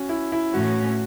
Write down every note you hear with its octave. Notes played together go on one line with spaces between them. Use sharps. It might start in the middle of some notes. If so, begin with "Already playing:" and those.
Already playing: C#4 F#4
E4
E4
A2 E3 C#4 F#4